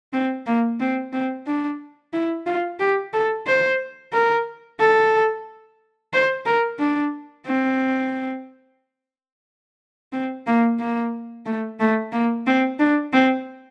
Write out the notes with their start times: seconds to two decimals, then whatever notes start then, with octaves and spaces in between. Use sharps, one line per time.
0.13 C4
0.46 A#3
0.80 C4
1.13 C4
1.47 D4
2.13 E4
2.46 F4
2.80 G4
3.13 A4
3.47 C5
4.13 A#4
4.80 A4
6.13 C5
6.46 A#4
6.79 D4
7.46 C4
10.13 C4
10.47 A#3
10.79 A#3
11.46 A3
11.80 A3
12.12 A#3
12.47 C4
12.79 D4
13.13 C4